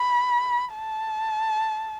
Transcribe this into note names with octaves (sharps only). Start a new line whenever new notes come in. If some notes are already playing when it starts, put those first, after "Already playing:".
Already playing: B5
A5